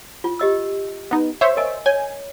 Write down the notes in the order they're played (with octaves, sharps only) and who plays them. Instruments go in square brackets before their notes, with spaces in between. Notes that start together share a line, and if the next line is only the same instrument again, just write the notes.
[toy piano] F4
G4 D#5 E6
[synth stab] B3 D#4
C5 C#5 E5
[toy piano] A#4 D#5 G#5
[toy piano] C#5 [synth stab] G#5